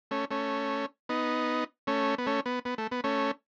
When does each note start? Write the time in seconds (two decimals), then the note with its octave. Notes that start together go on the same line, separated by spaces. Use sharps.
0.11 A3 C#4
0.30 A3 C#4
1.09 B3 D#4
1.87 A3 C#4
2.18 B3
2.26 A3 C#4
2.46 B3
2.65 B3
2.78 A3
2.91 B3
3.04 A3 C#4